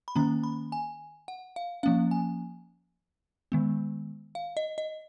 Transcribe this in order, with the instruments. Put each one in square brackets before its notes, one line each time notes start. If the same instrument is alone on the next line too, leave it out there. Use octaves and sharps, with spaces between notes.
[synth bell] B5
D#3 A#3 C#4 A#5
B5
G#5
F#5
F5
F3 A#3 C#4 F5
G#5
D#3 G#3 B3
F5
D#5
D#5